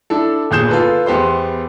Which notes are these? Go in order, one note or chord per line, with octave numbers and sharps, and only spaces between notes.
D4 E4 A4
G1 A#2 G#4 G6 E7
F4 A4 B4
E2 B3 G4 C5 C6